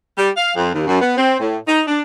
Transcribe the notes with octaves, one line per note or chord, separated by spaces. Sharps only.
G3
F5
F2
D#2
F#2
B3
C4
A2
D#4
D4